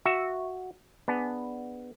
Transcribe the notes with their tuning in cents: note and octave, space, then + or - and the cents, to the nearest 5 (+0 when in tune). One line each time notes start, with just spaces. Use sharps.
F#4 +0 E5 +0
B3 +5 D4 +10 G#4 +0